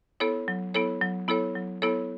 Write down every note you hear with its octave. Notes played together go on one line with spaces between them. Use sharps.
B3 E4 A4 C#5
F#3
B3 E4 A4 C#5
F#3
B3 E4 A4 C#5
F#3
B3 E4 A4 C#5